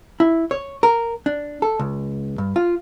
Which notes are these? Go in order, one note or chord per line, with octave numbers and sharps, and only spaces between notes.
E4
C#5
A#4
D4
A4
C#2
G2
F4